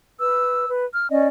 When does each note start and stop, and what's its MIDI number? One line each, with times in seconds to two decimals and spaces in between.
0.20 0.68 71
0.20 0.68 88
0.70 0.86 71
0.93 1.08 89
1.10 1.28 61
1.10 1.28 74
1.10 1.28 75